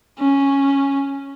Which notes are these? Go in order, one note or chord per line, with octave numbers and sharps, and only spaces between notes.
C#4